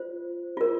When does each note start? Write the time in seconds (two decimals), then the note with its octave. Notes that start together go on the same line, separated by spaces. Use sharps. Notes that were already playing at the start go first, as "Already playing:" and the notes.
Already playing: F4 C5
0.57 F4 A#4